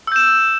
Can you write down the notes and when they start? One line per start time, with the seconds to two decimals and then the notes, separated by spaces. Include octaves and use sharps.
0.07 E6
0.12 G6
0.16 E7